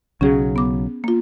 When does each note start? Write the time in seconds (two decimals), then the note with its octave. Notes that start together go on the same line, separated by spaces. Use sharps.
0.21 B1 C#3 F#3 C#4 G#4
0.56 B3 D6
1.04 A#3 F4